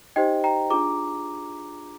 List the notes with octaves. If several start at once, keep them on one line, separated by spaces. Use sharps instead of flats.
D#4 G4 C5 D#5 G5
G5 A#5
D4 F4 G#4 A#5 D6